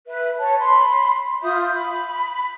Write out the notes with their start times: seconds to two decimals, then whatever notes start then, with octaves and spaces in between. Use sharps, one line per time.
0.07 B4 E5
0.40 C#5 A5
0.59 B5 C6
1.43 F4 E5 D#6 G6
1.73 B5